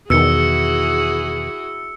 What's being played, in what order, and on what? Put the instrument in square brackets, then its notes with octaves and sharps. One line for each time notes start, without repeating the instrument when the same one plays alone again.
[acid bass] E2 [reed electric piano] B2 D#3 [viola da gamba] E4 F#4 G#4 [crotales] E6 C#7